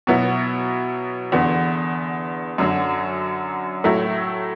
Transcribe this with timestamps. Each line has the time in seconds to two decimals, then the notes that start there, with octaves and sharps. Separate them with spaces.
0.07 B2 F#3 B3 E4
1.32 E2 D3 B3
2.58 F#2 D3 F#3
3.84 A2 F#3 A3 E4